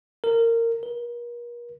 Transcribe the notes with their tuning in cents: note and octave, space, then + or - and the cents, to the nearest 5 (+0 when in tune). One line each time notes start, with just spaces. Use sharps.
A#4 -20
A#4 +40